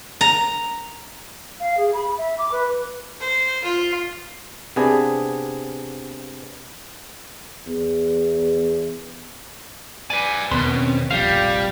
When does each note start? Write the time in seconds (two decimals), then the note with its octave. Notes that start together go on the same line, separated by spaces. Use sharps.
0.21 A#5
1.60 F5
1.77 G#4
1.94 B5
2.17 E5
2.38 D6
2.52 B4
3.20 C5
3.64 F4
4.76 C3 B3 D4 G#4
7.67 E2
10.10 B4 D5 G#5
10.51 E2 B2 D#3 B3 B4 C6
10.67 C4 C#4
11.11 F1 A#1 F2 G3 F5 G5